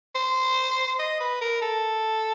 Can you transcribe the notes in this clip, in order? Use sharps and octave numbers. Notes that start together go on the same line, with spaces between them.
C5
D#5
B4
A#4
A4